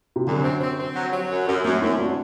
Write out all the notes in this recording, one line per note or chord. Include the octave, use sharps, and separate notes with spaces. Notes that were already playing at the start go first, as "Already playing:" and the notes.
C3
F#2 D3
C4
C4
C4
F#3
F#3
F#2
F#2
F#2 A3 C4
F#2 C4 E4
D4 F#4